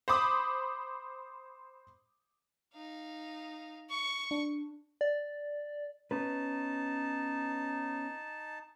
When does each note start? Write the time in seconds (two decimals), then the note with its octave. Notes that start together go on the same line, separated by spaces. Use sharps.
0.08 C5 B5 D6 D#6
2.74 D#4 F5
3.90 C#6 C#7
4.31 D4
5.01 D5
6.11 B3 C#4 D#4 B4 A5